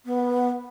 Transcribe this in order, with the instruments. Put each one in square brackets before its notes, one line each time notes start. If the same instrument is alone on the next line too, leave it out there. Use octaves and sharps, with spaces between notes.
[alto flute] B3